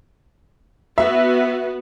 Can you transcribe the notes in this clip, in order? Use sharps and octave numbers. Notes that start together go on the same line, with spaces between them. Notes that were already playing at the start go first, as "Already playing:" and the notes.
B3 F#4 B4 E5